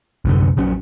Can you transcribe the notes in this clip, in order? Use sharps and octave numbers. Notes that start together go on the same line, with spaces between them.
C2 F#2 D3
A#1 F#3 C#4